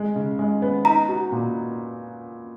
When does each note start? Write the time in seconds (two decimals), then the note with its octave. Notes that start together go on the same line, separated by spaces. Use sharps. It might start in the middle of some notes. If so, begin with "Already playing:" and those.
Already playing: G#3
0.16 C#3
0.39 G#3
0.62 B3
0.85 D#4 A#5
1.08 F#4
1.32 A#2